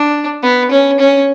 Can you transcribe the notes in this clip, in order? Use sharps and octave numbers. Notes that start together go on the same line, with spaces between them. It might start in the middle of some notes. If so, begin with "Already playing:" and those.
Already playing: D4
B3
C#4
C#4